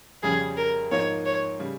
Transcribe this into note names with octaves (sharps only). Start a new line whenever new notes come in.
F2 C#3 G3 C#4 G#4
A#4
G#2 F3 A#3 D#4 C#5
C#5
C#3 G3